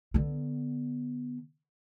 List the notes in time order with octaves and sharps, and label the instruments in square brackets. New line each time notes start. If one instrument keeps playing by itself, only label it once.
[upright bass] D3 B3